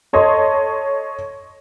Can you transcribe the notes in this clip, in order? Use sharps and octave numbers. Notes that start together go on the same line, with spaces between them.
A4 C#5 D#5 C6